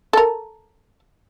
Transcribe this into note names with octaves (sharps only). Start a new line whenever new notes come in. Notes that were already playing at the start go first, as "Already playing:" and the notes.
A4 A#4